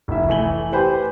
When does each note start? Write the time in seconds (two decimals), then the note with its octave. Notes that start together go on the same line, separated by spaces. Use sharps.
0.08 F1 E4 E5
0.28 E3 A3 G#5 F#7 G7
0.72 G4 B4 C5 G#5 B5